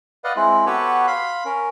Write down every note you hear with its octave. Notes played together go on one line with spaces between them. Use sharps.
B4 D5 D#5 F5 F#5
G#3 C4 E4
B3 F#4 G4 A4 B4 C#5
F5 B5 C6
C#4 A#4